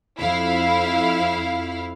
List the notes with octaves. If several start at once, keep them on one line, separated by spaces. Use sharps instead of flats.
F2 E4 F5